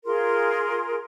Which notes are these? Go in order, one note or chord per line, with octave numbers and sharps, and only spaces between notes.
F4 G#4 A#4 C6